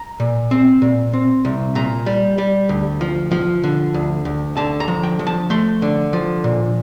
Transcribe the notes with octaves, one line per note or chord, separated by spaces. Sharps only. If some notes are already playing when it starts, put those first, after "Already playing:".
Already playing: A#5
A#2
C4
A#2
C4
C2
A#2 A#5
G3
G3
D2
F3
F3
D3
D2
D2
D3 A5
A#5
F3
G5
F3
A5
A3 C6
D3
F3
A#2